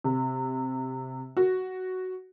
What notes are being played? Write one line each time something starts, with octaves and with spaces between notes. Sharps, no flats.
C3
F#4